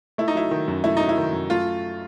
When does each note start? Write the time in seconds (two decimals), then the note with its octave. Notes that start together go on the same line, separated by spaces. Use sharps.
0.18 A3 E4
0.28 D#4
0.35 F#3 E4
0.51 D#3
0.68 F#2
0.84 A3 E4
0.97 F#3 D#4
1.09 E4
1.17 D#3
1.33 F#2
1.50 A3 F4